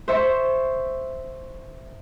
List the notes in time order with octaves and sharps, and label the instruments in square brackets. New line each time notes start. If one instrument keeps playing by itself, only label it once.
[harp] C5 E5 C#6